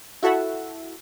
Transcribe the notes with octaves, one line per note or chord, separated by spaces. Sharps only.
E4 F#4 A4 E5 F#5